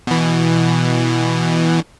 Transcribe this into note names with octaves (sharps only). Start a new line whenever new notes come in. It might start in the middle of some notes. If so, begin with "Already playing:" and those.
B2 E3